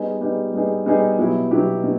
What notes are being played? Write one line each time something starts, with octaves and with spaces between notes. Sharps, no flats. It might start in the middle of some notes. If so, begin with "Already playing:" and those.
Already playing: G3 B3 D#4 G#4
G3 B3 D#4 G#4
G3 B3 D#4 G#4
G3 B3 D#4 G#4
B2 F#3 B3 E4 G4
B2 F#3 B3 E4 G4
B2